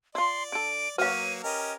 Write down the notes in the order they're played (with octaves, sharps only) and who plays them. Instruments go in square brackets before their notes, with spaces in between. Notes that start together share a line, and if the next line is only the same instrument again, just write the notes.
[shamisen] E4 F4 [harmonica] D5 [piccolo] C6
[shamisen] D3 A4 [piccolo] D7
[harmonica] F#3 A#3 [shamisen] F#4 C#5 [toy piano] B4 F5 [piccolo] D#7
[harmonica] C#4 G4 A#4 [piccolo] D#5